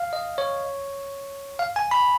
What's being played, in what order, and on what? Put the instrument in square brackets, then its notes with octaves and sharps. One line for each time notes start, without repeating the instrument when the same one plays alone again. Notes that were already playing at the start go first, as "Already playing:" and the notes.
Already playing: [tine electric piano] F5
D#5
C#5
F5
G#5
B5